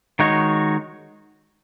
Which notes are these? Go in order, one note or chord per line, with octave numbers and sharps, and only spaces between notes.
D#3 G#3 D#4 F#4 C#5